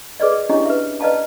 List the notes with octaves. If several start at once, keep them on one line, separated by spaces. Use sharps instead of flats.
G#4 B4 D5 D#5
C#4 D4 E4 G4 C#5 D#5
B4 E5
B4 D5 D#5 F5 A5 A#5